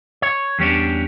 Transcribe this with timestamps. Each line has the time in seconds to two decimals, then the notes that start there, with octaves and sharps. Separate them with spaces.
0.22 C#5
0.59 E2 G3 C#4 D4